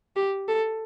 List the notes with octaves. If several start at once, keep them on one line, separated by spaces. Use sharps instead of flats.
G4
A4